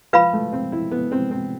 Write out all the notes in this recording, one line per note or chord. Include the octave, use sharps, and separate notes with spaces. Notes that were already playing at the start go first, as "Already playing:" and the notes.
F3 B4 F5 B5
A3
C4
E4
B3
C4
C4